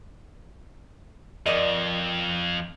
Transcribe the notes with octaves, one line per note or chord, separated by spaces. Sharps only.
F2 A#4 D5 D#5